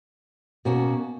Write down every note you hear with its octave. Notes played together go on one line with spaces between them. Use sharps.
B2 A#3 C#4 F#4